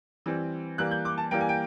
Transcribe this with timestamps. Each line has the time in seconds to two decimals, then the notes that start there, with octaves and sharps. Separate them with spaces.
0.26 E3 G3 C4
0.78 E3 G3 A#3 F#6
0.91 G6
1.05 D6
1.18 A5
1.31 E3 G3 A#3 G5
1.41 G#5
1.49 G5